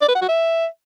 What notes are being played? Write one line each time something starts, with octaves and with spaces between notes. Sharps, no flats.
D5
B4
F#5
F#4
E5